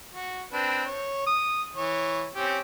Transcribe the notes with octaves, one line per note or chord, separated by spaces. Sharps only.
F#4
C4 D4 B4
C#5
D#6
E3 C#5
C4 C#4 G4